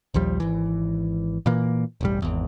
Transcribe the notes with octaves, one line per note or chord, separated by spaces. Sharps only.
A#1 D#2 F3 G3
G#1 E3
A#2 E3 A#3
E1 A1 G3
G#1 E2